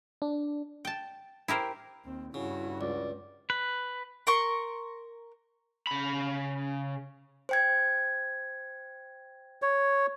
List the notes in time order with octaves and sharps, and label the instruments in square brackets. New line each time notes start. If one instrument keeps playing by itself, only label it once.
[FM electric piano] D4
[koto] G5 A5
E4 G4 A#4 C5
[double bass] D#2 [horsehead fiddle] C4
[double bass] G2 [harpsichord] C#3 [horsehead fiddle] E4 F#4
[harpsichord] C#2 [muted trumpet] D5
[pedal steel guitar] B4
[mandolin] A#4 C6 C#6
[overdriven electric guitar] C#3 B5
[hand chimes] C5 G5 G#6
[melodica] C#5